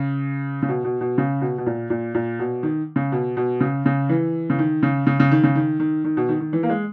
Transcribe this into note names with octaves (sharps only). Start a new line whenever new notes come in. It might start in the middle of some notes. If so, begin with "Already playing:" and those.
Already playing: C#3
C#3
B2
B2
B2
C#3
B2
B2
A#2
A#2
A#2
B2
D#3
C#3
B2
B2
C#3
C#3
E3
C#3
D#3
C#3
C#3
C#3
D#3
C#3
D#3
D#3
D#3
B2
D#3
D#3
E3
A#3
G#3